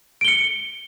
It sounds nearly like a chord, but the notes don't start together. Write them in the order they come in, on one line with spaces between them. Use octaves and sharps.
D7 G7 C#7